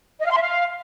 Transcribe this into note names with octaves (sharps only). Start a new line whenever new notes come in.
D#5
F5
C6
E5
F5